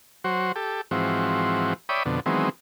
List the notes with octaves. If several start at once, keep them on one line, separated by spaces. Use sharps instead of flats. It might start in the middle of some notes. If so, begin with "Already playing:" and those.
F#3 F#4 C5
G4 A4
G#2 E3 F3 C4 F#4
C#5 D5 E5 G5 B5 D#6
F2 B2 D3
D#3 E3 F#3 G#3 B3 C4